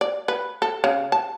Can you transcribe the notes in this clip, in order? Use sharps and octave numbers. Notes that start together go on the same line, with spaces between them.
D5
B4
A4
C#3
A5